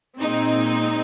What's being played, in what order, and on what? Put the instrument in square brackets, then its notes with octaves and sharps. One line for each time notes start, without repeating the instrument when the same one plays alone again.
[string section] A#2 G#3 C4 D#4